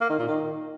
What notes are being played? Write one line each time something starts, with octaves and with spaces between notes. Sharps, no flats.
A#3
D#3
A#2
D#3